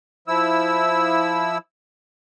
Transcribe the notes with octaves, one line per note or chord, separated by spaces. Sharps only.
F3 E4 E6